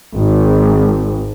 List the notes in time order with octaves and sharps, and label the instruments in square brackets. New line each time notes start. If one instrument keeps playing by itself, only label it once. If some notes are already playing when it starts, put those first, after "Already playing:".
[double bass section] G#1